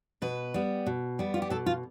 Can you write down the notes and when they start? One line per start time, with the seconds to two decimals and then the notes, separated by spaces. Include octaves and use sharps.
0.22 B2 B4
0.54 G3 B3
0.86 B2
1.19 G3 B3
1.34 F4
1.42 G4
1.50 B2 A4
1.66 F4